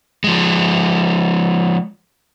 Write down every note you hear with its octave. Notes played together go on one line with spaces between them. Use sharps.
F3 G#3